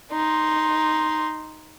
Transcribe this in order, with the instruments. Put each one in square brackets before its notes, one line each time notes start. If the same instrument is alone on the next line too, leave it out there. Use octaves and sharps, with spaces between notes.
[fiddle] D#4 C6